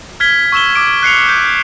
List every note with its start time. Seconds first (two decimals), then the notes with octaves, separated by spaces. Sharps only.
0.20 F6 G#6 B6 G7
0.52 C#6 E6 E7 G7
0.75 D6 E6 D7
1.03 F#6 C7 C#7 F7
1.29 G6